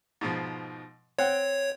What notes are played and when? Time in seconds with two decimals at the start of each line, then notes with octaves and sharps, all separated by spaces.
0.21 G#2 B2 F3
1.19 C4 C#5 F#5 G5